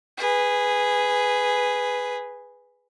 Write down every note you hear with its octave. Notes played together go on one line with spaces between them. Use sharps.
G#4 B4